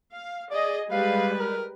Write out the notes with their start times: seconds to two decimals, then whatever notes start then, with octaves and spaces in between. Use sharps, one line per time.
0.11 F5
0.51 G#4 D5 D#5
0.91 G3 G#3 B4 F5
1.39 A#4